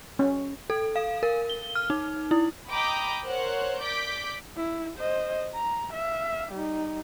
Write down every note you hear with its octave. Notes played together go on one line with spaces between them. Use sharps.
C#4
A4
F5
A#4
G7
F6
D#4
E4
D#5 G5 A#5 B5 D6 D#6
A#4 C5 C#5 F#5 F#6
D5 D6 G6 B6 D7
E4
C5 D#5
A#5
E5 F5
G3 D#4